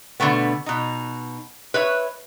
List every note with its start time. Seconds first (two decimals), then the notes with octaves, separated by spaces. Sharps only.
0.20 B2 D3 G#3 A3 B3
0.66 B2 D#4
1.74 B4 C#5 E5